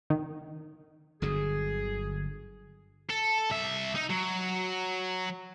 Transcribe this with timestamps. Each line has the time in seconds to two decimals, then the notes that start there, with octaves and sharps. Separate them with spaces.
0.10 D#3
1.22 G1 D3 F#3 G#4
3.10 A4
3.50 C2 E5
3.96 D#4
4.10 F#3